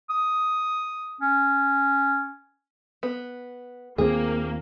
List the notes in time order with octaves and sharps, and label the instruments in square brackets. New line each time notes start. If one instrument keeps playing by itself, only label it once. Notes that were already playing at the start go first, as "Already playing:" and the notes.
[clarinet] D#6
C#4
[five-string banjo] B3
[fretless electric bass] D#2 A#2 C4 [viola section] A#3 [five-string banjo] G#4